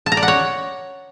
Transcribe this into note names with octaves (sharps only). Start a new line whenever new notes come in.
A5
A#5
D5
F#5
C#5